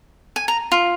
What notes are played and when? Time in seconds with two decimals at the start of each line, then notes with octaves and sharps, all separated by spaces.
0.36 G#5
0.48 A#5
0.72 F4